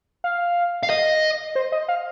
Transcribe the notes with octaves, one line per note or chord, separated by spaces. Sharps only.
F5
F5
D#5
C5
D#5
F5